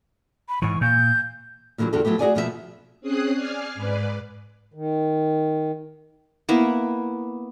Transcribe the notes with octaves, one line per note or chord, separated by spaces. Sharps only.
B5
G#2 E3 C#6
A#2 G6
A#2 D3 E3 F#3 G3
E2 D3 F#4 G4 A4
F3 F#3 A3 B3 G4
F#4 G#4 B4 D5 F#5 G#5
D#2 B2 F3 B3 G4 E5
C4 C#4 G#4 D#6 F#6 C7
D5 G#5 F6 C7
G#2 B4 D5
D#3
A#3 B3 E4